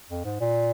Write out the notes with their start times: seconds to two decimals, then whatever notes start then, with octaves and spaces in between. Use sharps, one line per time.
0.10 F2
0.25 G#2
0.40 A#2